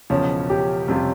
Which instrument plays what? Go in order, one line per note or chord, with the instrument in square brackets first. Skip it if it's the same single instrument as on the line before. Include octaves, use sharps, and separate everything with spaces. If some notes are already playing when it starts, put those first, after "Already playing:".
[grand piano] E1 E2 C#3 F3 [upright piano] C#4
[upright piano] G4
[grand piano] F2 C3 G3 C#4 F4